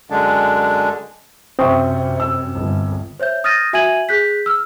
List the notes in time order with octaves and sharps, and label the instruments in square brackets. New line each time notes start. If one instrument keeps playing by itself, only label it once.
[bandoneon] F#2 D3 G#3 D4
[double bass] F#2 C3 [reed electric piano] C4 [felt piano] E5 C#6 D#6
[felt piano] E6
[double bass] G1
[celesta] C5 C#5 E5 G6
D#6 F6 G6 A6 A#6 D#7
F#4 E5 G#5 G#6 D#7 F#7
G#4 F#6 G6 B6
E6 F6